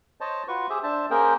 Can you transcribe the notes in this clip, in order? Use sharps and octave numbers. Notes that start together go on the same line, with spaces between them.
C5 C#5 D#5 A5
F4 F#4 B4 C#6
G4 G#4 C5 E5
D4 C5 E5 A5
A#3 C#4 G#4 A#4 C5 G5